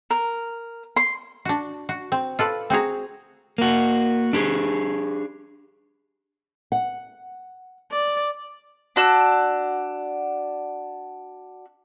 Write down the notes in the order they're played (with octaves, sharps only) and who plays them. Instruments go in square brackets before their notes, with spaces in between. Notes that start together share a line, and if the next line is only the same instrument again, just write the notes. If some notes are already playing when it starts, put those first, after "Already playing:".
[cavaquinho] A#4
C6
[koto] D4 F#4
F#4
C4
F4 A4 B4 D5
C4 F#4 G#4 A#5
[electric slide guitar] A#3 F#4
D4 G4 G#4
[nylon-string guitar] F#5
[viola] D5
[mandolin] D4 F#4 E6